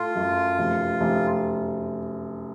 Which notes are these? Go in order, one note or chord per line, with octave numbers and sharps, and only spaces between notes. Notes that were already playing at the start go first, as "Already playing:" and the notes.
Already playing: A2 A3 F4
F#2
F1
F1